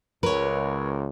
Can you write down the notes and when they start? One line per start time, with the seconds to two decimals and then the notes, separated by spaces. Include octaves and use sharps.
0.23 C#2 A#4 B4 C#5